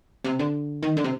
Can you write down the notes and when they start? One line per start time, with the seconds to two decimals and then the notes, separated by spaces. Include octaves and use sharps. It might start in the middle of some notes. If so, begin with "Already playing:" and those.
0.24 C3
0.39 D3
0.83 D#3
0.97 D3
1.04 C3